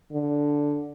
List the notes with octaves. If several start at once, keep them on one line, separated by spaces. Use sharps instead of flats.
D3